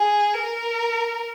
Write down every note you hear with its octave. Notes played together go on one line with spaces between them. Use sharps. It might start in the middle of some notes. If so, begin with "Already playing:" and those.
Already playing: G#4
A#4